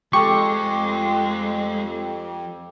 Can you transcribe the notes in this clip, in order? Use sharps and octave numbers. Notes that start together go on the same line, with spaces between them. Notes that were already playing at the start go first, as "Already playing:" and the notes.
F2 G#3 G4 A4 C#6